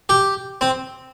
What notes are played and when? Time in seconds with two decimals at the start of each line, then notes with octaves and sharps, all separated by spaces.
0.09 G4
0.61 C4